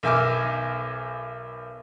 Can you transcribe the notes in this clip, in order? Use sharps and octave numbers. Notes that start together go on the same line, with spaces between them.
B1 D#3 E5 G#5 D6 F6